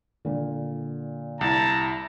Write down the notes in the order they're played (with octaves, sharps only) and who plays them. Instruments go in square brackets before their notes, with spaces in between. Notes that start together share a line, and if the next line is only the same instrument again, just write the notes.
[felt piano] A#2 D3
[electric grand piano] C2 E4 [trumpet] A5 [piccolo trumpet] A#5